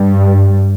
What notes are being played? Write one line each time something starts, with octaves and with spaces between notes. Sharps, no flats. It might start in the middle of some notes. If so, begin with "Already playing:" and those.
Already playing: G2 G3